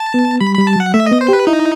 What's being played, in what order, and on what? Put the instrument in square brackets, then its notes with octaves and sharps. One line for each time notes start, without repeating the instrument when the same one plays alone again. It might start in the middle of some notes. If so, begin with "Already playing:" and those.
Already playing: [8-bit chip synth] A5
[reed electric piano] B3
[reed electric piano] G3 [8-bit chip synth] B5
[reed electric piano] G3 [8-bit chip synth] B5
[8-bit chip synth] A5
[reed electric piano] F#3 [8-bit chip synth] F#5
[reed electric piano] A3 [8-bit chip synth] E5
[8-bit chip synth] D#5
[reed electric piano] B3
[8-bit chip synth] C5
[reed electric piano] G4 [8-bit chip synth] B4
[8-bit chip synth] D#4 [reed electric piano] E4